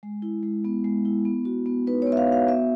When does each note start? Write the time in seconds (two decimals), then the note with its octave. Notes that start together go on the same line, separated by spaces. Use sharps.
0.03 G#3
0.22 E4
0.43 G#3
0.65 B3
0.84 G#3
1.05 E4
1.25 B3
1.45 F#4
1.66 B3
1.87 D#4 B4
2.02 B3 C#5
2.12 E5
2.17 F5
2.28 F#4 F5
2.48 B3 E5